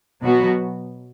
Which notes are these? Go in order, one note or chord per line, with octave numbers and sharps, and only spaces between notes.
B2 F#3 B3 F#4